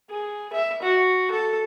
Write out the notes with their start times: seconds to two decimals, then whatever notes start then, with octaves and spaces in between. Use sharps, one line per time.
0.11 G#4
0.53 E5
0.83 F#4
1.31 A4